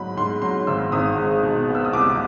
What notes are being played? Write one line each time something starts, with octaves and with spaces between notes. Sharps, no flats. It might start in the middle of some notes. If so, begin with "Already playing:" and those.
Already playing: G#2 F#3 B5
G#2 C6
F#3 C6
G#1 E6
G#1 D#6
G#3
B2
B3
E6
D#6
C2 D6